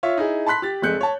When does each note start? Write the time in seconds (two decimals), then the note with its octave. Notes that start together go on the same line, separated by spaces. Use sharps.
0.03 F4 C#5 E5
0.18 D#4 E4 G#4
0.46 A5 B5 C6 F#6 B6
0.62 G4 A6
0.82 F1 C3 G#3 F#6 G6 C#7
1.01 C#5 A5